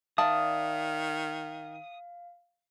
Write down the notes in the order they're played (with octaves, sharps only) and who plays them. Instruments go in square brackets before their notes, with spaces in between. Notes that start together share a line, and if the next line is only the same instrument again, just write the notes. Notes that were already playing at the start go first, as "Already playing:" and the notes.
[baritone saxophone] D#3 [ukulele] D5 E5 A5 [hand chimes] F5 [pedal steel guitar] D#6